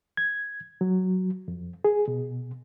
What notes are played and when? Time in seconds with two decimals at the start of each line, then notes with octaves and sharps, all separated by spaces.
0.17 G#6
0.81 F#3
1.48 F2
1.85 G#4
2.08 B2